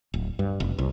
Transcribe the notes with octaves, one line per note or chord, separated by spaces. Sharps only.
D1
G2
F1
C2